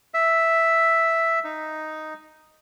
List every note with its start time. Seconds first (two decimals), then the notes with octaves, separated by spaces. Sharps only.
0.14 E5
1.44 D#4